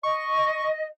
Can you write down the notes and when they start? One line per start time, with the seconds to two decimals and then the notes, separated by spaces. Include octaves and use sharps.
0.03 D#5 C#6